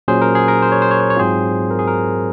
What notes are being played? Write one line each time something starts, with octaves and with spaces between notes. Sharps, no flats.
A#2 F#3 C#4 G#4 C5
A#4
G#4
A#4
C5
C#5
C5
C#5
C5
C#5
G#2 F#3 C4 F4 G#4 C5
A#4
G#4
A#4